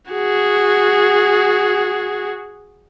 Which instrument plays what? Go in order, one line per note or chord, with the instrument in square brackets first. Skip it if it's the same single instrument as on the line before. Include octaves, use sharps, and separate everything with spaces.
[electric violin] F#4 G#4